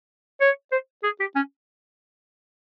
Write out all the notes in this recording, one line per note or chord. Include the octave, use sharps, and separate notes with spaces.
C#5
C5
G#4
G4
C#4